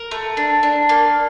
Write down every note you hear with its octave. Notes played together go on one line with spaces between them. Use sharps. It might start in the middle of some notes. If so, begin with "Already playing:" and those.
Already playing: A#4
A3
D4
D4
A#3